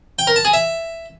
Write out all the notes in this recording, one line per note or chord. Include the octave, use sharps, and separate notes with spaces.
G5
A#4
A5
G#4
E5